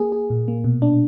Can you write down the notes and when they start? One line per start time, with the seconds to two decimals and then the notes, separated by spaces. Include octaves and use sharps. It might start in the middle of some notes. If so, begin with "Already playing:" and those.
Already playing: A#3 G#4
0.12 G#4
0.30 A#2
0.48 A#3
0.64 B2
0.82 D4